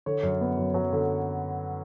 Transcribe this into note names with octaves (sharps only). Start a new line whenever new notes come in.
D3 C#5
F#2
B3
F#2
F#3
D3